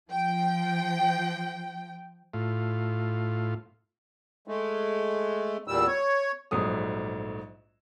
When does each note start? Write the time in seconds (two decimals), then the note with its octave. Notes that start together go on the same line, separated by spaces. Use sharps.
0.11 F3 G5
2.34 A2 F4
4.48 G#3 A3
5.68 E2 A#2 G3 E6
5.87 C#5
6.51 A#1 G#2 F#3 A3 D#6